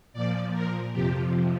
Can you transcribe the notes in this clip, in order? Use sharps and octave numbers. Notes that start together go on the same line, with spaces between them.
A#2 F3 D5
A#4
F2 C3 F3 G4